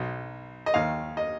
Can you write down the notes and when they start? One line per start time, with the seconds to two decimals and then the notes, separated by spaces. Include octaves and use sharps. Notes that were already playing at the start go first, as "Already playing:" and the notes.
Already playing: B1 B2
0.66 D#5
0.74 D#2 D#3 F5
1.17 D#5